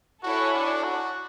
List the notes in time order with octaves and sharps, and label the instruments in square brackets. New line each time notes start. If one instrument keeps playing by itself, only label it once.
[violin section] E4 A4 C#5 G#5 [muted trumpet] F#4
[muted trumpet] D4
F#4